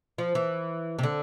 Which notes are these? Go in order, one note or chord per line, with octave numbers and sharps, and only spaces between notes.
F3
E3
C3
D3